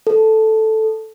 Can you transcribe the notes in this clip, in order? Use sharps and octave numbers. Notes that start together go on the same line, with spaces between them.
A4